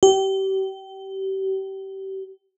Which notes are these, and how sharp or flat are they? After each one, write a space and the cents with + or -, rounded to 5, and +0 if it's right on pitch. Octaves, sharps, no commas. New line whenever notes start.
G4 -30